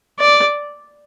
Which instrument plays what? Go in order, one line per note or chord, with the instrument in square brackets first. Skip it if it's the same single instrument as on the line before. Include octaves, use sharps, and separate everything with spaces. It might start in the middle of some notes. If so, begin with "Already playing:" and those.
[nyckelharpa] D5